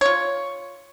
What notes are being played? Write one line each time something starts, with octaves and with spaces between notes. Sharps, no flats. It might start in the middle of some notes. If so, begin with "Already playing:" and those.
F4 C#5